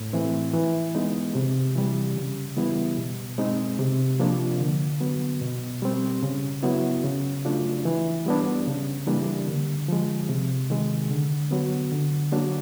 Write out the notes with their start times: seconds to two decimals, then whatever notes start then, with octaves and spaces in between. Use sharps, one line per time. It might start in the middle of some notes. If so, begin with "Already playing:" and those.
Already playing: A2
0.13 E3 A3 C4
0.53 E3
0.95 G#3 B3 D#4
1.35 C3
1.76 E3 G3
2.16 C#3
2.57 E3 G3 B3 E4
2.97 B2
3.38 G#3 C4 D#4
3.79 C3
4.19 F3 A#3 D4 F4
4.60 D3
5.01 F#3 B3
5.41 B2
5.82 G3 C4
6.22 C#3
6.63 F#3 B3 E4
7.04 C#3
7.45 F#3 A3 D4 F4
7.85 E3
8.26 G3 B3 D4
8.67 C#3
9.07 E3 G3 A#3 D4
9.48 D3
9.88 F3 G#3
10.29 C3
10.70 D#3 G#3
11.10 D3
11.51 F#3 B3
11.92 D3
12.32 F#3 A#3 D4